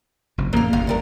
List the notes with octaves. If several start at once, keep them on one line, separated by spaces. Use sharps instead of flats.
F#1 F#2 C3
A1 F2 C#3 A#3 F5
G1 E2 C3 F5
D2 G3 A#4